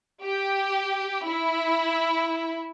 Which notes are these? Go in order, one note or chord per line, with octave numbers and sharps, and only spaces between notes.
G4
E4